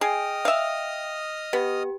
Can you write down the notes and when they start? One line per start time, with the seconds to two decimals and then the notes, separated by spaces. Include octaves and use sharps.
0.01 G#4 D#5 G5 D#6 F6 D7
0.45 E5 F5
1.53 B3 G4